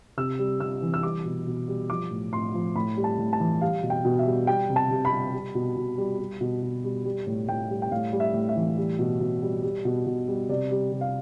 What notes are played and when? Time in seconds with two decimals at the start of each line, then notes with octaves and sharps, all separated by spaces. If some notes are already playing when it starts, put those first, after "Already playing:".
0.17 C3 E6
0.39 G3
0.60 C3 E6
0.82 E3
0.94 E6
1.03 G3 D6
1.25 B2
1.47 B2
1.68 G3
1.90 F3 D6
2.11 A2
2.32 A2 C6
2.54 F3
2.75 A2 B5
2.97 G3
3.04 A5
3.19 A2
3.33 A5
3.40 E3
3.61 G3 F5
3.83 B2
3.90 G5
4.05 B2
4.19 E5
4.26 G3
4.47 G3 G5
4.69 C3
4.76 A5
4.91 C3
5.05 B5
5.12 G3
5.34 G3
5.55 B2
5.76 B2
5.98 G3
6.19 G3
6.41 B2
6.62 B2
6.84 G3
7.05 G3
7.27 A2
7.48 A2 G5
7.70 G3
7.82 G5
7.92 A2 F5
8.12 G3
8.20 E5
8.34 A2
8.49 E5
8.56 E3
8.77 G3
8.99 B2
9.20 B2
9.42 G3
9.63 G3
9.85 B2
10.06 B2
10.28 G3
10.49 C3 D5
10.71 G3
10.92 C3
11.01 F5